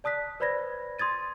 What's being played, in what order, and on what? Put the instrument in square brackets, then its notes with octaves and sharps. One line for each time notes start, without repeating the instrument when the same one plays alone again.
[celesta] D5 A5 D#6 F#6 B6
B4 C5 D5 B5 G#6 A#6
C6 D#6 G#6 A6 D#7